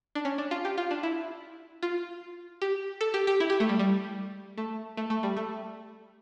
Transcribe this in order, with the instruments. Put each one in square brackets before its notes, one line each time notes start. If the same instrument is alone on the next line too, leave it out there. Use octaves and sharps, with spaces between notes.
[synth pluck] D4
C#4
D4
F4
G4
F4
D4
E4
F4
G4
A4
G4
G4
E4
G4
A3
G3
G3
A3
A3
A3
G3
A3